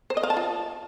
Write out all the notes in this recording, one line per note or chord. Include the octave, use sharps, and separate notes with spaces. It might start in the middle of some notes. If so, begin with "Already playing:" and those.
C5
D#5
F5
A5
F4